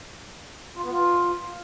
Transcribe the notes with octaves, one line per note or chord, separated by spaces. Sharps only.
F4
B3
F4